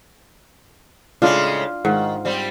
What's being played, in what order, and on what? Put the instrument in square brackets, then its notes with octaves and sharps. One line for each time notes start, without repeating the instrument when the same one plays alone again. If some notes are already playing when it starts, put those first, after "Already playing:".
[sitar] A2 C#3 G#3 [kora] D4 [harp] F4
[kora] G#2 [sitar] D#3
[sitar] G3 C4